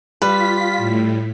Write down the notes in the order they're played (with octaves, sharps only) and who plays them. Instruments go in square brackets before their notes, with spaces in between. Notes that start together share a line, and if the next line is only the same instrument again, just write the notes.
[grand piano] G3 [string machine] F4 B6 [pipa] B4
[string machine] A2